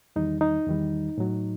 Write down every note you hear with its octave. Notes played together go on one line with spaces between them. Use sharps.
E2 D#3 G3 D#4
D#4
E2 D#3 G3
A2 F#3